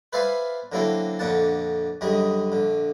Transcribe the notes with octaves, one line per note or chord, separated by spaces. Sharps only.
B4 C5 D5 E5 F5 G#5
D3 F#3 A#3 C4 E4 A4
A#1 F2 D3 A#3 F#5 A5
F#2 D3 G3 G#4 D#5
A#1 D3